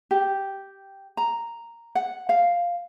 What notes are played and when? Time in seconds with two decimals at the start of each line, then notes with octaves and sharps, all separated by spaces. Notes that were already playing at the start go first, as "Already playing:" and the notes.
0.11 G4
1.17 A#5
1.95 F#5
2.29 F5